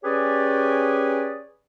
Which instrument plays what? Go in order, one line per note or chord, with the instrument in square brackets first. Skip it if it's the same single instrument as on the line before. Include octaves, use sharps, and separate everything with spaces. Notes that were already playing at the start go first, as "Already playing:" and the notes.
[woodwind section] C#4 G4 G#4 B4 C#5 D5